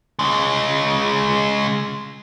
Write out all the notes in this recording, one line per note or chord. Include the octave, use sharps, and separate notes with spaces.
C#3 G#3